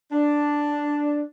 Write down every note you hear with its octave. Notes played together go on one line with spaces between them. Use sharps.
D4